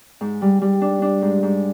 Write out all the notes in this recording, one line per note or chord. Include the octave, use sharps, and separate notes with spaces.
G#2
G3
G3
D4
D4
G#2
G#2